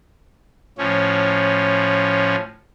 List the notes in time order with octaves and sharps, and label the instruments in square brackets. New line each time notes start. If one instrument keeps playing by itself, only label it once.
[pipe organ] A2 F3 C#4